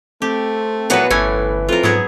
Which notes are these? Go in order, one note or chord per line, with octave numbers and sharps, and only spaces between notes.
A3 C4 G4
A#2 E3 F#3 B3 F#4 B4
G1 A2 E3 A3 C#4 G#5
F2 F4 A#4
G#2 F#3 B3 G#4